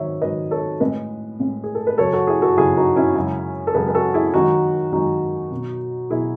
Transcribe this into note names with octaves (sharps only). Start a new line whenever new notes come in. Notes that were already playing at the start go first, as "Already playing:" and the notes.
Already playing: G#2 D#3 F#3 C#5 E5
G#2 D#3 F#3 B4 D#5
A4 C#5
A2 G#3 B4 D#5
A2 G#3
G#4
A4
B4
F#2 C#3 F#3 A4 C#5
F#4 A4
E4 G#4
F#4 A4
F#2 C#3 F#3 E4 G#4
D#4 F#4
C#4 E4
F#2 C#3 G#3
A4
F#2 C#3 G#3 G#4 B4
B4
F#4 A4
E4 G#4
F#2 D#3 G#3 D#4 F#4
F#2 D#3 G#3 D#4 F#4
B2 F#3
B2 F#3 E4 G#4